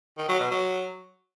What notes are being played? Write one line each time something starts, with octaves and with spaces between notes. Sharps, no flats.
D#3
F#3
B2
F#3